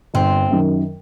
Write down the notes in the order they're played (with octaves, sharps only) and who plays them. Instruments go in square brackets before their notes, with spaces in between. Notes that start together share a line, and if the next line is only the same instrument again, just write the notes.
[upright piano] G1 [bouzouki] C4
[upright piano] F#2 D#3 F#3